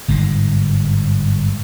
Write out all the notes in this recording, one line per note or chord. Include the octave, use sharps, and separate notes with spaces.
G1 G#2 G#3